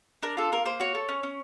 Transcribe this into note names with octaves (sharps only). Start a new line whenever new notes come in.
D4 A#4
F4 A4
A#3 A#4
A#3 C5
F#4 C#5
A4
C#4
C#4